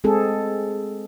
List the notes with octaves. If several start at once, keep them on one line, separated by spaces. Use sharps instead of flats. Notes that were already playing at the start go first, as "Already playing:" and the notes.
G#3 C4 G#4 A4